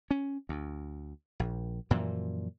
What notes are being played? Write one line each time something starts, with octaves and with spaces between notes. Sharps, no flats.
C#4
D2
A#1
F#2 A#2 E3 F3